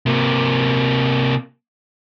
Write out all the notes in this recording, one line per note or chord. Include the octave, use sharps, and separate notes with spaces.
C3 A#3